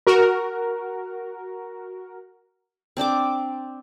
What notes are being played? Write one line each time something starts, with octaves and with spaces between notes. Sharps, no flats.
F#4 A#4
C4 D4 G5 D6